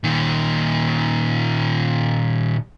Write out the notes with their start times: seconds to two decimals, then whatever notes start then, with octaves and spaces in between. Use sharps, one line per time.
0.04 A#2 D#3